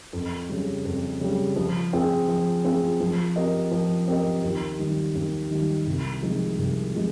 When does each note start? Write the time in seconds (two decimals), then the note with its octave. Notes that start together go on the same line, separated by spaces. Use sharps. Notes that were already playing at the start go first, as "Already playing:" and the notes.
0.13 F2
0.49 C#3 G3
0.85 F2
1.21 C#3 G3
1.56 F3
1.93 C4 F4 G#4
2.28 F3
2.65 C4 F4 G#4
3.00 F3
3.36 C4 G4 A#4 D#5
3.72 F3
4.08 C4 G4 A#4 D#5
4.44 D#2
4.79 D#3 G3
5.15 D#2
5.51 D#3 G3
5.87 C2
6.22 C3 F3 G#3 D#4
6.59 C2
6.95 C3 F3 G#3